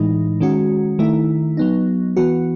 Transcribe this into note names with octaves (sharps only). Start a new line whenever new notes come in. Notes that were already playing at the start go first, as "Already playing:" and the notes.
Already playing: A2 E3 G#3 D#4
D#3 G#3 C#4 F#4
D#3 A3 E4
F#3 B3 D#4
E3 B3 F#4